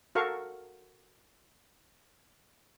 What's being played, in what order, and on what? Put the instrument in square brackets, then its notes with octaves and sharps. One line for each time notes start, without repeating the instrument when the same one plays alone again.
[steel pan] F#4 A4 A#4 F5 C#6